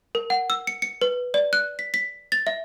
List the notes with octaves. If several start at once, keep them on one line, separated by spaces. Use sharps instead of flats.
A#4
F#5
E6
C#7
C#7
B4
D5
F#6
B6
B6
A6
E5